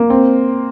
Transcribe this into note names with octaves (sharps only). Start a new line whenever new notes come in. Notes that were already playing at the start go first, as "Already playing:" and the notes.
Already playing: A#3
C4